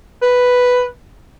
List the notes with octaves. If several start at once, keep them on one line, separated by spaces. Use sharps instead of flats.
B4